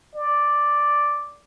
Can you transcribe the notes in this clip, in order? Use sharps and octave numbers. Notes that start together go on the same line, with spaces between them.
D5